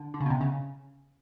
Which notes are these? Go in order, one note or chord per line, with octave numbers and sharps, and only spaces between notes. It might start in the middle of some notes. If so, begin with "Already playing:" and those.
Already playing: D3
D3
C#3
B2
C3
C#3